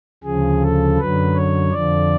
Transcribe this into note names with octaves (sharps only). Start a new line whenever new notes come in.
D2 C#3 F3 G#4
A4
F#2 D3 F#3 B4
C#5
F2 D3 F3 D5